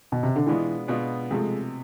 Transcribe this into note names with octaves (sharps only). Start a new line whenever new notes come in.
B2
C3
D3
B2 E3 G#3 B3 D4 F4
B2 G#3 B3 D4 F4
C3 F3 G#3 A3